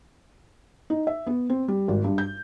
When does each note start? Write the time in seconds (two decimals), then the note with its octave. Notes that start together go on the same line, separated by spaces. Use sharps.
0.90 D#4
1.07 E5
1.27 B3
1.50 C4
1.68 G3
1.88 G#1
2.04 G2
2.18 G6